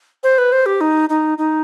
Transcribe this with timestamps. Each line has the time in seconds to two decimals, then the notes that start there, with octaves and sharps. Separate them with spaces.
0.23 C5
0.38 B4
0.52 C5
0.66 G4
0.81 D#4
1.09 D#4
1.38 D#4